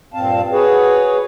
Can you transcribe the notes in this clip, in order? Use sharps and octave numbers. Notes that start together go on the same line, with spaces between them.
G2 A#2 C4 F5 A5
F#4 G#4 B4 C#5